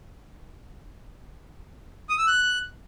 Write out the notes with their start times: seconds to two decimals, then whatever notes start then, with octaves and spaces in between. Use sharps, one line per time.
2.09 D#6
2.18 E6
2.27 F#6